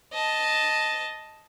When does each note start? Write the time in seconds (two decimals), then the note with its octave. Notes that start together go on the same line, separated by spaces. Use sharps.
0.13 D#5 A5